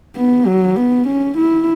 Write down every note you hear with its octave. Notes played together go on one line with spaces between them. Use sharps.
B3
F#3
B3
C#4
E4